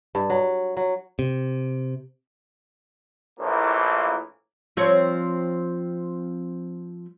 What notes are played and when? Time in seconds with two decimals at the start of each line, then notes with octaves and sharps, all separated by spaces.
0.15 G2
0.30 F#3
0.77 F#3
1.19 C3
3.39 A#1 A2 E3 F3 A#3
4.77 F3 C4 C#5